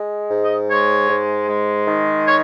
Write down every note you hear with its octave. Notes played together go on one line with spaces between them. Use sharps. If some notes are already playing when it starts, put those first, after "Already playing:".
Already playing: G#3
G#2
D#5
G#3 C#5
G#2
G#3
D#3
C#5